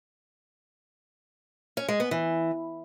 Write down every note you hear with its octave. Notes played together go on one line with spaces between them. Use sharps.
C#4
G#3
B3
E3